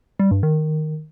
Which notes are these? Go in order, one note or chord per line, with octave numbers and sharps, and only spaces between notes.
G3
G2
D#3